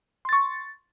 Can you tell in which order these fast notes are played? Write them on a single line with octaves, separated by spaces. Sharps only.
C6 A6 C#6